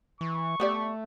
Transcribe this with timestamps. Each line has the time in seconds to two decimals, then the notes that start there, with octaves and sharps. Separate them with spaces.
0.21 E3 C#6
0.60 A3 B3 G4 D5